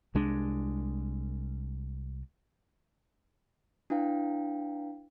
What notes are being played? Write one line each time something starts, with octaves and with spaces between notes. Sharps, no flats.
C2 G#3 D4
D4 E4 B4 F5 G5